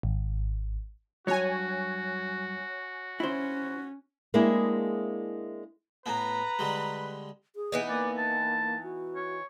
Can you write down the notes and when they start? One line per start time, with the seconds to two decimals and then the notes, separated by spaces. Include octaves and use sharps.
0.03 G#1
1.27 G2 F#3 F#4 C#5 G#5
3.20 C#4 E4 C5
4.34 G#3 A#3 C4 D4 E4 G#4
6.06 A2 B3 B4 A#5
6.59 D3 G3 G#3
7.56 G#4
7.72 E3 B3 D#4
7.89 A#3 D5
8.18 A5
8.83 F#4
9.16 C#5